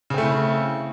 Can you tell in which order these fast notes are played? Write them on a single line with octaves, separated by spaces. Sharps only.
C#3 C4 A3 E4